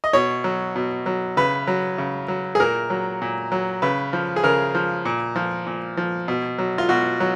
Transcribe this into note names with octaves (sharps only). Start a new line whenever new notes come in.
D#5
B2 C#5
F#3
B2
F#3
C#3 B4
F#3
C#3
F#3
G#4
A#2 A#4
F#3
A#2
F#3
C#3 B4
F3
G#4
C#3 A#4
F3
A#2
F3
A#2
F3
B2
F#3
F4
B2 F#4
F#3